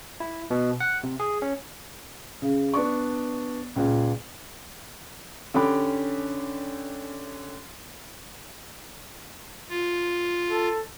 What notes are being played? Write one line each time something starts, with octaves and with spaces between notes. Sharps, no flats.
E4
B2
F#5
C3
G#4
C#4
C#3
B3 D4 D5 C#6
C#2 A#2
D3 C#4 G4 B5 D6
F4
A4